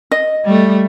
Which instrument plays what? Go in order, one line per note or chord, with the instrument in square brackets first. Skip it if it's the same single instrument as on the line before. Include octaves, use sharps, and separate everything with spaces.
[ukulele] D#5
[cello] G3 A3